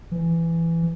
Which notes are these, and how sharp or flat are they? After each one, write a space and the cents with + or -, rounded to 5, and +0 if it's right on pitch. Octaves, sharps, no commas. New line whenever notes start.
E3 +15